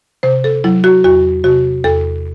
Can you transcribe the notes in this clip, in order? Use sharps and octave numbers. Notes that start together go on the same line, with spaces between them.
C3 C5
A4
F#3 E4
F#4
E2 F#4
C3 F#4
E2 A4